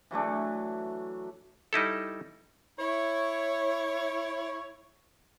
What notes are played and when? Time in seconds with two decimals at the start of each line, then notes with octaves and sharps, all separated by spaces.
0.11 E3 F#3 A3 D4
1.73 G3 D#4 E4 A4
2.79 E4 C#5